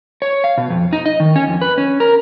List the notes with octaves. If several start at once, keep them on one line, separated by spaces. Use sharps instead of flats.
C#5
F5
B2
F2
D#4
D#5
D#3
C#4
F2
B4
C#4
A#4